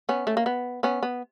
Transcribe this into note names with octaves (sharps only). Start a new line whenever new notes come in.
B3 C#4
A3
A#3
B3
B3 C#4
B3